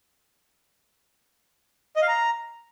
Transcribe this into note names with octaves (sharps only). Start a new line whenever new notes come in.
D#5
F5
A#5